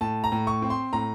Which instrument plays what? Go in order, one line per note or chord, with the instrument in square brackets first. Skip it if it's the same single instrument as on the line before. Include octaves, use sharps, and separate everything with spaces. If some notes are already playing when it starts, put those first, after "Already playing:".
[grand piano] A2 A5
A#5
A2
C#6
C4
C6
A2 A#5